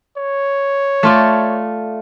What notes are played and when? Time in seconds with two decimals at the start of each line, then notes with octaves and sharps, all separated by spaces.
0.17 C#5
1.03 A3 F4 D5